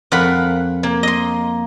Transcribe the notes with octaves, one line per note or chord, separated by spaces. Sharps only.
F2 A#4 F5 F#5 B5
A#3
D#5 C6